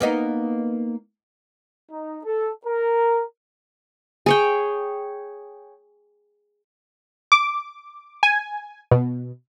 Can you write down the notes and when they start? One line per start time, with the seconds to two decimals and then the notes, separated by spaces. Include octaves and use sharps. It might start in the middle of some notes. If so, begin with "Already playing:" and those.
0.01 A#3 B3 D#4
1.90 D#4
2.24 A4
2.66 A#4
4.26 G#4 C#5 G5
7.32 D6
8.23 G#5
8.91 B2